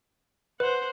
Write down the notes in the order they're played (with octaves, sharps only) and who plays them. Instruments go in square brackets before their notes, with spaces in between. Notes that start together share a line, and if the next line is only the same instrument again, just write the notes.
[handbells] B4 [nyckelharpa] C5 F#5